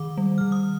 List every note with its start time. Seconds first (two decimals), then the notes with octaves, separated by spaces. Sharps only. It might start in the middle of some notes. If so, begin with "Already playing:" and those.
Already playing: D#3 D6
0.18 G3
0.38 D#3 F6
0.52 D#6